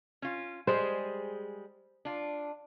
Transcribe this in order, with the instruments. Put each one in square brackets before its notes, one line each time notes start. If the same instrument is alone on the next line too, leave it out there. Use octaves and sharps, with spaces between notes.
[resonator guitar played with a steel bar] C#4 F4
[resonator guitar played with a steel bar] G3 G#3 G#4 [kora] C5
[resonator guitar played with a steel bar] D4 F4